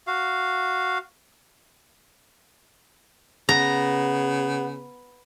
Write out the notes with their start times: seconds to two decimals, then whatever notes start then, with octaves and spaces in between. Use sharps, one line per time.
0.07 F#4 F5
3.49 C#3 B3 A#5